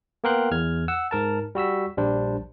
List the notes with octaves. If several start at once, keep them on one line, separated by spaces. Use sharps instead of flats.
A#3 B3 A#4 G5 C6 F#6
E2 F6 G#6
F#5 E6
G#2 A#4 A5
G3 F#4 E6 B6
A#1 G3 D4 C5